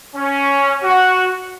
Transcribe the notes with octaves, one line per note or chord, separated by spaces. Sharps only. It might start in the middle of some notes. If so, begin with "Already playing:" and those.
C#4
F#4